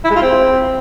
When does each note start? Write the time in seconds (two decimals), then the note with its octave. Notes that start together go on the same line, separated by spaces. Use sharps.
0.04 E4
0.10 G#3
0.16 F4
0.22 C4